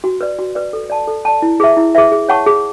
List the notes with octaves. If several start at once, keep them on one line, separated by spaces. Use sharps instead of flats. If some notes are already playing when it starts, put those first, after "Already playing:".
F#4
B4 D5
F#4
B4 D5
A4
D5 A5
A4
D5 A5
E4
G#4 B4 E5
E4
G#4 B4 E5
G#4
C#5 F#5 A5 C#6
G#4